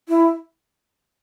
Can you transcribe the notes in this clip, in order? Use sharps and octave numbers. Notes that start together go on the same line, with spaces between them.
E4